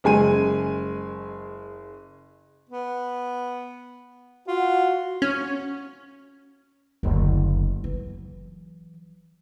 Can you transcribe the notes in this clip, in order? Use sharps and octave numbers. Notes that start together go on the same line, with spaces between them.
F#1 G#3 G#5 D#7
B3
F4 F#4
C#4
F#1 D2
E3 F#3